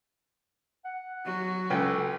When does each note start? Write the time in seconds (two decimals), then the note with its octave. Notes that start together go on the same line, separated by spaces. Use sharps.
0.85 F#5
1.25 F#3 F#4
1.70 C#2 C#4 A4 G5